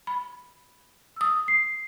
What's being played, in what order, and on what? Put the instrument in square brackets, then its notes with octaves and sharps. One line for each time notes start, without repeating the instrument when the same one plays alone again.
[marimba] B5
D#6 E6
[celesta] C7